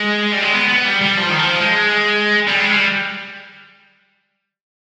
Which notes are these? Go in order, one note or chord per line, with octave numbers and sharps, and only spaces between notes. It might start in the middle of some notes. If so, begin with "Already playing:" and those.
Already playing: G#3
G3
G#3
B3
B3
G3
G3
F3
D#3
F3
G#3
G3
G#3
G3